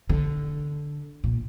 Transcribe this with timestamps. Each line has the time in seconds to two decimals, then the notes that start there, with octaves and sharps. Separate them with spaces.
0.10 D3
1.24 A#2